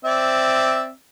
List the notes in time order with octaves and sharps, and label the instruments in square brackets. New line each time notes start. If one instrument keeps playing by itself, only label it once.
[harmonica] C4 D5 E5